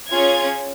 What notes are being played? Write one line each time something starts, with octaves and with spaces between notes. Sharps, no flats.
C#4 F4 G#4 G#6